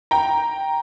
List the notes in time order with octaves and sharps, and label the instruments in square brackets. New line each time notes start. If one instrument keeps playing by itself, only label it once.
[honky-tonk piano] G5 A#5